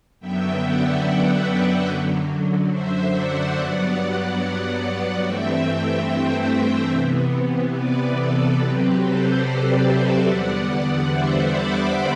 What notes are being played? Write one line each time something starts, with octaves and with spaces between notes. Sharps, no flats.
F#2 D3 F#3 B3 E5 G5
D5 F#5
B4 D5
F#2 D3 F#3
C5 E5
D5 F#5
G2 F#3 B3
G2 E3 A3 C4 E5 G5
C5 E5
C3 E3 B3
B4 D5
A4
C3 F#3 C4 G4 B4
A4 C5
B4 D5
C5 E5
E2 D3 G3 B3 D5 F#5
C5 E5
B5 D6